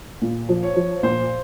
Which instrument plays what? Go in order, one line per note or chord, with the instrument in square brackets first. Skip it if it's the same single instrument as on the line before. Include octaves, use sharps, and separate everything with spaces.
[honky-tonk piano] A#2
F3
[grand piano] C#5
[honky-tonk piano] F3
[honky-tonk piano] A#2 [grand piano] C5